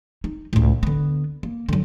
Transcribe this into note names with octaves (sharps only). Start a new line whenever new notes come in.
D#4
C#2 A2
D3 B3
A#3
D3 F#3